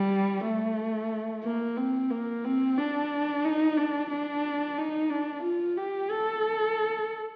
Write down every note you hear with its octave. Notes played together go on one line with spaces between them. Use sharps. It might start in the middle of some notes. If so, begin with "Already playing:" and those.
Already playing: G3
A3
A#3
C4
A#3
C4
D4
D#4
D4
D4
D#4
D4
F4
G4
A4